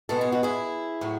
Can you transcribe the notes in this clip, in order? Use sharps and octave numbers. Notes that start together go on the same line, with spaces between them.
B2 G#3 B3 A4
G#4
F#4
E4 G#4
A2 F#3